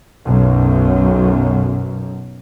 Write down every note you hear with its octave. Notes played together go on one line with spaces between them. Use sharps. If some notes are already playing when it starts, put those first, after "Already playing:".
B1 F#2